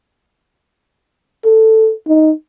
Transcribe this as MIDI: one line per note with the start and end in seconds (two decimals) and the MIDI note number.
1.45 1.92 69
2.08 2.32 63